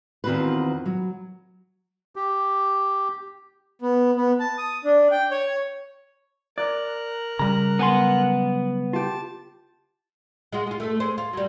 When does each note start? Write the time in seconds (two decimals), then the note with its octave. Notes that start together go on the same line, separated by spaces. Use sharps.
0.24 E2 D#3 C4 F4 F#4 B4
0.86 F#3
2.16 G4
3.82 B3
4.16 B3
4.40 A5
4.58 D#6
4.84 D4
5.11 G5
5.31 C#5
6.58 A#4 D5 F#6
7.39 C#3 G3 A#5
7.79 B1 B3 G#5 C6
8.93 F4 G4 A5
10.52 G#3 F4 F#4
10.67 F4 G#4
10.80 A3 A4
11.00 G#3 C5
11.18 F4
11.33 F#3 G3